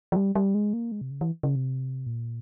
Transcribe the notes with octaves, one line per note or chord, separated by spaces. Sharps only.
F3
G3
G3
G#3
A#3
G#3
C3
C#3
E3
C#3
C3
A#2